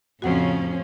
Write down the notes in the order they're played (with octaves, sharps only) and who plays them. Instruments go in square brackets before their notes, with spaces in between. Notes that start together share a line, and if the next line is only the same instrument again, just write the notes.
[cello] F2 [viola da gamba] A2 F3 C4 [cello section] C#3 C#4 [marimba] F#4 F#5